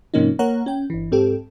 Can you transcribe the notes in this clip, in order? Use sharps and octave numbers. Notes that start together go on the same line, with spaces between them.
G#2 C3 F3 A#3 C#4 D#4
A#3 C#5 F#5 A#5
C#4 G5
G1 E3
G#2 C4 G4 A4